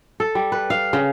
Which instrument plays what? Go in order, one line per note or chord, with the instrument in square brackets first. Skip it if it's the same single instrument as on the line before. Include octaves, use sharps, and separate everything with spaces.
[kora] A4
G3
B4
F5
C#3